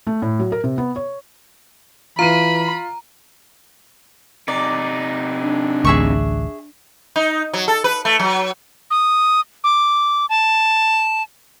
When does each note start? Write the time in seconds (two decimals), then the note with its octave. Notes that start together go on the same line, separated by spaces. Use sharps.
0.07 A3
0.22 A2
0.39 F#3
0.52 A#4
0.64 C3
0.78 B3
0.96 C#5
2.19 E3 F4 A#5 B5 D#7
4.48 C3 D#4 D5
5.40 D4
5.85 A1 D2 G#4 E5 C#6
7.16 D#4
7.53 F#3
7.68 A4
7.84 B4
8.05 A3
8.19 F#3
8.91 D#6
9.64 D6
10.29 A5